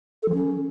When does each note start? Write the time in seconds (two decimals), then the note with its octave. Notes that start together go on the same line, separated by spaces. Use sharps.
0.23 A4
0.29 F3
0.34 C#4